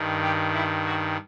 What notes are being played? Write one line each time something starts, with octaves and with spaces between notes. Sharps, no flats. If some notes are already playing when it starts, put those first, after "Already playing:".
Already playing: G2 D#3
G4
E4
F#4